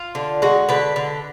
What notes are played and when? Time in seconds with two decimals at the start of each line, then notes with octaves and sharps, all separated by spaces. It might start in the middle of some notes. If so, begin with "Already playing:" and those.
Already playing: F4
0.15 D3
0.42 G#3 F#4
0.69 D3 B4
0.96 D3